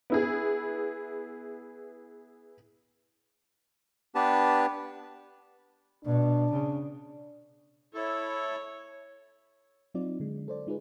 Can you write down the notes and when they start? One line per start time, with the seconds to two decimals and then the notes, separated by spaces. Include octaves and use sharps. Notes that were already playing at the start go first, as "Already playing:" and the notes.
0.10 B3 E4 G#4
4.15 B3 D4 G4 B4 A5
6.05 B2 D4
6.51 C#3
7.94 E4 A4 C#5
9.94 F#3 C4 D#4 F4 D5
10.20 D3 G#3
10.48 A4 C5 D5
10.67 G#3 D#4 F4 G#4 B4